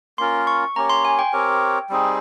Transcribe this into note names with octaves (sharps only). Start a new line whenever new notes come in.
A#3 C#4 F4 A#4 C6
C#6
A#3 C#4 G4 C#5 A#5
C6
G#5
G5
C4 G4 A#4 C#5
G3 C4 D#4 G#4